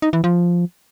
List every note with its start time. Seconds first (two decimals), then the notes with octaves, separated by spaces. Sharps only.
0.02 D#4
0.13 E3
0.24 F3